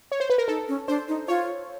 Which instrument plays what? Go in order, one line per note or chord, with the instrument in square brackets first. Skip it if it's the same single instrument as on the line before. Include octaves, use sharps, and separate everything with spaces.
[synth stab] C#5
C5
B4
A#4
[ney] D#4 [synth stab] A4
[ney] C#4
[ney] D4 [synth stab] C5
[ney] D#4
[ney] F4 [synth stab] C#5